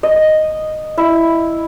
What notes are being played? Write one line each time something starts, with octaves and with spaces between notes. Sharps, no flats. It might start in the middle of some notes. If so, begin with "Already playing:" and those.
D#5
E4